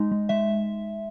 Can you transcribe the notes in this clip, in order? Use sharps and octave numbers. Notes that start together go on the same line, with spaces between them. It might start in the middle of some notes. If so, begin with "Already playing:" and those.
Already playing: G#3 D#4
G#3
G#3 E5